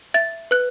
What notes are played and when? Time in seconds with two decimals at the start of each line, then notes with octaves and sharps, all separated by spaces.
0.14 E5 A6
0.51 B4 F#6